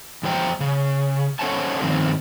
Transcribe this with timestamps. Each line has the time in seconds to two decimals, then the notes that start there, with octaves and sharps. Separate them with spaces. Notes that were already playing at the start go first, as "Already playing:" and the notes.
0.23 E2 F3 C5 G5 A#5
0.60 C#3
1.39 C#4 A4 C5 F#5 G#5 A5
1.81 G2 D#3 F3 C4